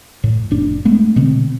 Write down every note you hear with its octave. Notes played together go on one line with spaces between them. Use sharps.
A2
F1 D4
G#3 A3 B3
B2 D3 C4